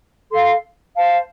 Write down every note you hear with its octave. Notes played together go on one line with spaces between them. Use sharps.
A4 F5 C6
C5 F5 A5